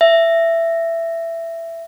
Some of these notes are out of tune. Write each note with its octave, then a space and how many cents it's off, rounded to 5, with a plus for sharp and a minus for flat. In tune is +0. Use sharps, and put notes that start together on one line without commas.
E5 +15